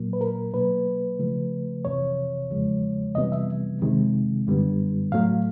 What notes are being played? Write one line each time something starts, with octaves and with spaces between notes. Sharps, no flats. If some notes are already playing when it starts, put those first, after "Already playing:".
Already playing: A#2 F#3 A#3
B4
A#4
B2 F#3 A#3 B4
C#3 F3 A3
F2 C3 E3 C#5
E2 C#3 F3 G#3
F2 C3 E3 G3 B3 D#5
E5
F2 C3 D#3 G#3
F#2 D3 G3 B3
A2 F#3 A3 F5